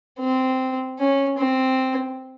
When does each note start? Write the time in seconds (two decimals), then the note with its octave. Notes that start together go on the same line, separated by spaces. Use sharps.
0.20 C4
0.99 C#4
1.39 C4